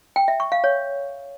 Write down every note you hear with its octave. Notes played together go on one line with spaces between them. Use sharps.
G5
E5
C#6
F5
C#5